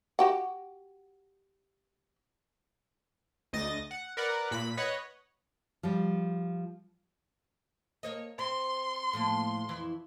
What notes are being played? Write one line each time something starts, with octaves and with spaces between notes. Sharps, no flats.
F#4 G4 F#5
D2 D#5 A6 A#6
F#5
A#4 B4 D5 F#5
A#2 B5 B6
B4 C#5 D#5 F#5 F#6
F3 G3
A#3 C#5 D#5
C4 C6
A2 F3 A#3
F2 E3 E4